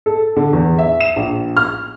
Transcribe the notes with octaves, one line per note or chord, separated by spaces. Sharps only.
A4
D3
E2
E5
E7
A#1
F6